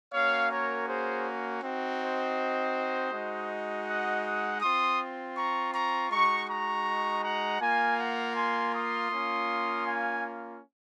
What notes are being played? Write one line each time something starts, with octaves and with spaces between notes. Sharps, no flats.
A#3 C#4 F#4 C#5 F5
A#4 C#5
G#4 C5
C4 D#4 F#4
C5 D#5
G#3 D#4 F#4
D#5 F#5
D#5 F#5
C4 F4 C6 D#6
A#5 C#6
A#5 C#6
G#3 D#4 F#4 A#5 C#6
A#5 C#6
F#5 A#5
A#3 F4 F5 G#5
F#5 A#5
G#5 C6
C6 D#6
A#3 C#4 F4
F5 G#5